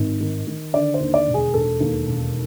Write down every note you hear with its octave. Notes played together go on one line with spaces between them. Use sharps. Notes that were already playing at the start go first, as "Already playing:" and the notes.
Already playing: G#1
D#3
D#3
D3 D5
C5
D#2
D5
E1
G#4
E1 A4
D#2
E1